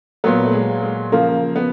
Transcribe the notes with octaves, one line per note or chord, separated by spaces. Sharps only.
A#2 F#3 B3
A3
G#3
G#3
C#3 F3 A#3
B3